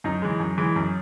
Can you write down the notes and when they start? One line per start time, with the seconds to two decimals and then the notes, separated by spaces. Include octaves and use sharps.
0.04 F#2 D#4
0.22 E3 G#3
0.40 F#2
0.58 E3 G#3
0.76 F#2